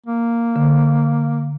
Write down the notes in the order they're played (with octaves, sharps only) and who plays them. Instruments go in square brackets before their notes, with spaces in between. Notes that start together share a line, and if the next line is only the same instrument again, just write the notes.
[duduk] A#3
[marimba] D3